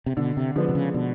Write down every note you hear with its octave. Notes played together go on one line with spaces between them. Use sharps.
C3
B2 D3
C3
D3 F3 G#3 B3 D4
C3
C#3
B2 D3